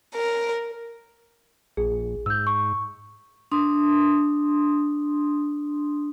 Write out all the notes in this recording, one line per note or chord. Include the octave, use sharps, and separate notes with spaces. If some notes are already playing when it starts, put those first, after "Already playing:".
A#4
A#1 G#4
G#2 E6 G6
C#6
D4 C6 D#6